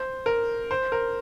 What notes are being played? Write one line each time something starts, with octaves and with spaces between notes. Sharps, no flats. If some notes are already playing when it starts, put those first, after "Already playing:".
Already playing: C5
A#4
C5
A#4